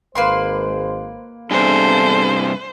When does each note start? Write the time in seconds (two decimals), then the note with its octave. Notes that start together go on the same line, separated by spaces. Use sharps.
0.15 G#1 G#3 A#3 B4 C5 C6
1.51 G2 C3 B3 D4 G#4 A4 C5